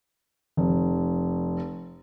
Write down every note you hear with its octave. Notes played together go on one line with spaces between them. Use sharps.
F1